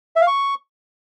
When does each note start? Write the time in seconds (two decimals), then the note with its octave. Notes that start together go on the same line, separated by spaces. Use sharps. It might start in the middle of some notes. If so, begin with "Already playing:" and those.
0.16 E5
0.21 F5
0.27 C#6